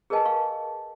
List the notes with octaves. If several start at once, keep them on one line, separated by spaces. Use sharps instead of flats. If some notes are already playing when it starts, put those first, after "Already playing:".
G#4 A#4 B4 D#5 G#5 A5
F5 C#6